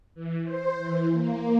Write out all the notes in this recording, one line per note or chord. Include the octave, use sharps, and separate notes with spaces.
E3
C5
E3
A#3